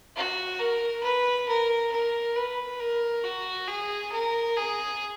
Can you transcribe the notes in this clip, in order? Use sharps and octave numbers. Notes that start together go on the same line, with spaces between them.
F#4
A#4
B4
A#4
A#4
B4
A#4
F#4
G#4
A#4
G#4